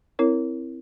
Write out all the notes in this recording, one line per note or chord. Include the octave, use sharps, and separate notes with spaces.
C4 E4 A#4 C#5